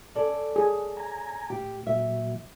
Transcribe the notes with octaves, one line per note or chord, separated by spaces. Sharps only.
C#4 A4 D5
G#4
G#5 A#5
A2 G4
A#2 F#3 E5